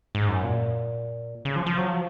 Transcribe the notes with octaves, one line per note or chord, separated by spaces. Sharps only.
G#2
F#2
A#2
C#3
F3
F3
F#3
F3